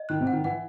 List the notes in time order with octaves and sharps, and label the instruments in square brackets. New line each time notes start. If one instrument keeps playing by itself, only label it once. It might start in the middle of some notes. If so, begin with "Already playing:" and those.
Already playing: [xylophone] D#5
[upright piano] D#3 [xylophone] F#6
[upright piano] C3
[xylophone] F#5
[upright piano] D#3
[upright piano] E3 [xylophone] F#5